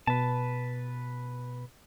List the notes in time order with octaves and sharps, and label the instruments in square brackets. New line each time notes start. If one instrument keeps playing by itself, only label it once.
[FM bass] B2 [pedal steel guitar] B4 A5